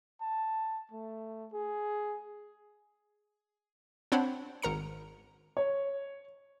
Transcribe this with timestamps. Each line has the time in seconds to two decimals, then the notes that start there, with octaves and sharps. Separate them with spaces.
0.21 A5
0.91 A3
1.53 G#4
4.12 C4 D4 C5 C#5 F#5 B5
4.62 G#1 A#4 A#5 C#7
5.57 C#5